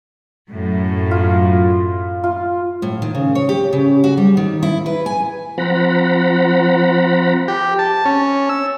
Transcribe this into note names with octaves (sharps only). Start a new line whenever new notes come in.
F#2 A2
F4
F4
A2
D#3
C#3
C#5
G4
C#3
F#4
G3
D#3
E4
B4
G#5
F3 C4 F#5 A#5 B5
G4
A5
C#4
E6